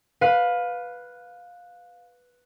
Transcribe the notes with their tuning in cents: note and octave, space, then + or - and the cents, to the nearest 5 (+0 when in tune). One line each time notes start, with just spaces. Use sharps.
B4 +0 F5 +20